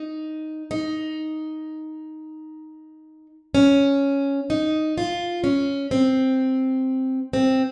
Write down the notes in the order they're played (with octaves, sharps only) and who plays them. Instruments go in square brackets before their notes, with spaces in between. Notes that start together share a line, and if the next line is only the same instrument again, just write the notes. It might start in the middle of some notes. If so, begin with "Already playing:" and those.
Already playing: [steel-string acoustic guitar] D#4
D#4
C#4
D#4
F4
C#4
C4
C4